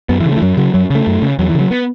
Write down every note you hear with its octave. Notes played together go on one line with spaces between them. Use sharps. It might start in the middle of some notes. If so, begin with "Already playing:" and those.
F#2 B3
E3
C#3
A3
E3
F#2 F#3
C#3 F#3
F#2 F#3
C#3 A3
F#2
C#3
E2 F#3
E3
C#3
F#3
B3